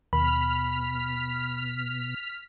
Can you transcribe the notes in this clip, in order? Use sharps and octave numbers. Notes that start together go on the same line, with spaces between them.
D#2 B2 B5 F6 B6